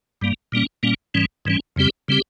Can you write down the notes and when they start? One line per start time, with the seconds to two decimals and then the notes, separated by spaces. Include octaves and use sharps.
0.21 G2 G3 A#3
0.52 A#2 G3 A#3 C#4
0.83 A#2 G3 A#3 C#4
1.14 G#2 E3 G3 C#4
1.45 G#2 E3 G3 C#4
1.76 F2 C#3 G3 C4 G4
2.08 C#3 G3 C4 G4